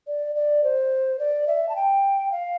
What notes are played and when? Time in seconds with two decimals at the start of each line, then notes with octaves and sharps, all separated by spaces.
0.07 D5
0.35 D5
0.64 C5
1.19 D5
1.47 E5
1.69 A5
1.76 G5
2.32 F5